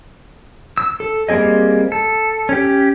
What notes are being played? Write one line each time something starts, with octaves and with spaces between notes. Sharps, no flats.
E6
A4
G3 A#3 C4 G#4 D#5
A4
C#4 G4